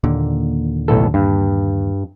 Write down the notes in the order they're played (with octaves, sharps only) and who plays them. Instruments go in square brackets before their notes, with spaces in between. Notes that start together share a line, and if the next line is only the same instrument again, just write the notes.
[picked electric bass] D#2 A#2 D3
[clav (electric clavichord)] B1 A2 A4
G2